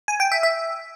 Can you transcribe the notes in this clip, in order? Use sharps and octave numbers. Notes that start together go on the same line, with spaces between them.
G#5
G5
E5
E5